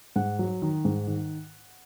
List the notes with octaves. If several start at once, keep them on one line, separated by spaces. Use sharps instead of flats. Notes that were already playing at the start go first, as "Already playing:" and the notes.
G#2 F#5
F#3
D#3
G#2
D#3